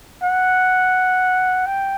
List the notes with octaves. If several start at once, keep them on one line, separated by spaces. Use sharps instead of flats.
F#5
G5